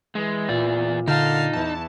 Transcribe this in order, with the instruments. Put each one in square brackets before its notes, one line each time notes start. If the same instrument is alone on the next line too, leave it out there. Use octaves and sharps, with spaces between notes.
[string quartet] E3 [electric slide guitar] G#3
[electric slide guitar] E2 D5 [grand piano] A#2
[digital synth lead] D3 [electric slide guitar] D#4 [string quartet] F5 A5 F6
[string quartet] E2 E3 [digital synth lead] A5